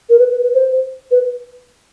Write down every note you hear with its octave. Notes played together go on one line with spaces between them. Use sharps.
A#4
B4
B4
B4
C5
B4